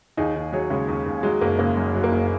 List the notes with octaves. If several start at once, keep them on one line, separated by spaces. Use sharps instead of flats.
D#2 D#4 G#4
D#2
F#3 G#4 C#5
C#3 G#3 C#4
D#2
D#2
F#3 G#3
F#1 A#3
C#3 A#3
F#2
F#3
A#3
F#1